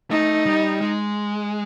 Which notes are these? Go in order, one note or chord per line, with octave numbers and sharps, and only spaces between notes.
A3 D#4
G3
G#3